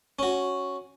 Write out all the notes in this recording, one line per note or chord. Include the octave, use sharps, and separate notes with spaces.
C#4 F#4